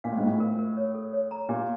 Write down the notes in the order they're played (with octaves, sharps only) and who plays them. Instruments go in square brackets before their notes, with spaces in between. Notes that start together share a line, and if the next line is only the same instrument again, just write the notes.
[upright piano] A#2 [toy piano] F5
[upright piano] A2
G#2
[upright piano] A2 [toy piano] F4
[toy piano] A#4
A#4
C#5
A4
C#5
A#5
[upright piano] A#2 [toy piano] G4